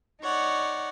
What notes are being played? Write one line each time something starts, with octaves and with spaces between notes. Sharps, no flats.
D#4 C#5 D5 F#5